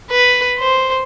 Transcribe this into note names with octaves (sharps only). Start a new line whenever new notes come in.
B4
C5